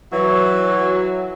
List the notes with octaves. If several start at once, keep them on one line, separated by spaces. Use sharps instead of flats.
E3 F#3